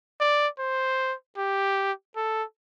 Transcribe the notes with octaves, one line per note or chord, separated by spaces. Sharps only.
D5
C5
G4
A4